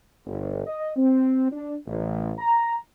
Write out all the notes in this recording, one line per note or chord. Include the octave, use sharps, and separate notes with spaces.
G1
D#5
C4
D4
A1
A#5